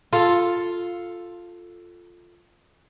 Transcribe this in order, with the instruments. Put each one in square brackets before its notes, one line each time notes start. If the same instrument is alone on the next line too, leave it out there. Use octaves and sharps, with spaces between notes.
[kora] F4 A4 F5